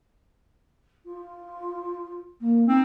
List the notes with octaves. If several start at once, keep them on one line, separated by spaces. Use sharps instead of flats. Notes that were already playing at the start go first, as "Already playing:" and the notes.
F4
A#3
C4 D#4